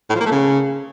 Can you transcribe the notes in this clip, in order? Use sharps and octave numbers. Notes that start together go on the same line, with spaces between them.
A2
F3
A#3
A3
C#3